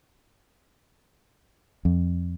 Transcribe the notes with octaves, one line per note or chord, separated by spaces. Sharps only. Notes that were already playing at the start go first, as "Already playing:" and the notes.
F2